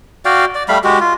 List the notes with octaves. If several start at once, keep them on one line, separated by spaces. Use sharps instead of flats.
F#4 D5 F5 G5
D5
G3 A3 F5 B5
G#3 F#4 G4
F4